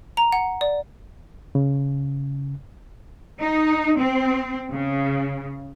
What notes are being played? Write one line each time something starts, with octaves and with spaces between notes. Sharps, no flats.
A#5
F#5
D5
C#3
D#4
C4
C#3